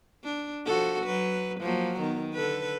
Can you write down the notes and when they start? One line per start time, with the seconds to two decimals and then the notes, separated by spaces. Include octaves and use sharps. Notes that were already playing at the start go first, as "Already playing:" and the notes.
0.24 D4
0.66 F3 F#4 A4
1.04 F#3 B4
1.60 F3 F#3 A#3
2.00 D#3 B3
2.34 D3 A4 B4